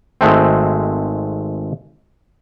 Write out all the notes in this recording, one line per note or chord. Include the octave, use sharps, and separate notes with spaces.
G#1 G#3 A3 C4